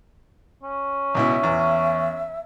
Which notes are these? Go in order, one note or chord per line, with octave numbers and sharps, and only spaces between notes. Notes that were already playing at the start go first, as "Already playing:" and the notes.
C#4
C#2 B2 E4 E5
E2 E3